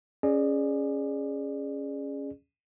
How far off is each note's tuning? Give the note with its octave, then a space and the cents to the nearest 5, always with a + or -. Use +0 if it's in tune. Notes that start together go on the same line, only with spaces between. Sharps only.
C#4 +0 G#4 +0 D5 +25